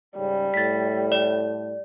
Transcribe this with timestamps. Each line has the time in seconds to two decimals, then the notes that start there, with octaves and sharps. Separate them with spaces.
0.17 G#2 C#3 G3
0.54 A2 A6 B6
1.12 D5